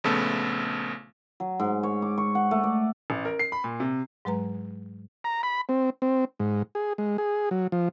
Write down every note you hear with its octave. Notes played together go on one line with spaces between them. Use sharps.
A#1 C#3 A3 B3 A4
F#3
G#2
C#5
D6
C#6
F#5
A3
D5
A1
A#4
C7
B5
A#2
C3
G#2 F#3 G#3 B4 A#5
A#5
B5
C4
C4
G#2
G#4
G#3
G#4
F#3
F3